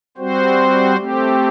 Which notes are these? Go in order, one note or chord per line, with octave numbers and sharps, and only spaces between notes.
G3 C4 F#4 C5
A3 C4 G4